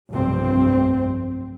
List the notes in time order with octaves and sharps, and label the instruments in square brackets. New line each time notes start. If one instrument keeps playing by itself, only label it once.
[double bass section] F1 B1 G2 C4